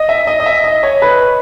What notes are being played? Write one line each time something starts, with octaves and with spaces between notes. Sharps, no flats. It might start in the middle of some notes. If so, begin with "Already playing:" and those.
Already playing: D#5
E5
D#5
D#5
E5
D#5
C#5
B4